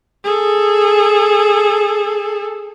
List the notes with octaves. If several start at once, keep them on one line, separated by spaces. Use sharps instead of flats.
G#4 A4